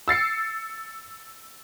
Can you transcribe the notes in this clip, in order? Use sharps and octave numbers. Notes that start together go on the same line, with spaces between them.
E6 A6 C7 C#7